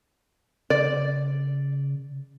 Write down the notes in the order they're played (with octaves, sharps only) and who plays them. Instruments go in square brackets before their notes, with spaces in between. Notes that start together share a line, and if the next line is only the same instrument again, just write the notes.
[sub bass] C#3 [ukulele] D5